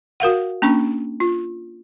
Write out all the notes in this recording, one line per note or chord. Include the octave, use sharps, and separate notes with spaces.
F#4 A#4 F5 F#5
A#3 C#4 D4 C#6
F4